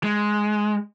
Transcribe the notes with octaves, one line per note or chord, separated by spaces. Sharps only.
G#3